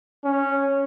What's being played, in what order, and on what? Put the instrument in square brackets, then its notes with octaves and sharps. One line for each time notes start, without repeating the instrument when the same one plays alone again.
[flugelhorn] C#4